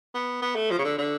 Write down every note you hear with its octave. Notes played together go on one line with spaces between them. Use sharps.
B3
B3
A3
F3
C#3
D3
D3